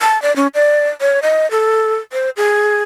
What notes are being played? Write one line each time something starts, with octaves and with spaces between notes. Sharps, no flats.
A5
D5
C#4
D5
C#5
D#5
A4
C5
G#4